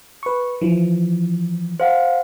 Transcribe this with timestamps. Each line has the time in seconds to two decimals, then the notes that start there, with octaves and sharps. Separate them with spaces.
0.23 B4 C#6
0.61 E3 F3
1.80 C5 F5 F#5